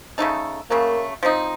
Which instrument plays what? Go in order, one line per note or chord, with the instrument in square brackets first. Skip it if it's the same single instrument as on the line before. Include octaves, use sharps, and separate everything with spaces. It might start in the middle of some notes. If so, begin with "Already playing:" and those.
[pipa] C#3 A3 D#4 A4
[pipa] C#3 F#3 A3 [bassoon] A#3
[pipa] F3 C4 D#4